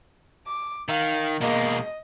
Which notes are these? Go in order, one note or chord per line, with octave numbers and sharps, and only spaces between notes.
D6
D#3 F5
B2 G#3 A#3 D#5